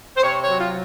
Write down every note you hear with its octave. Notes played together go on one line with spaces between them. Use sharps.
C5
C3 C#5
C#5
F#3
F4